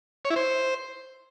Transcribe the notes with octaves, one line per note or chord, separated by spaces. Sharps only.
C#5
E4
C5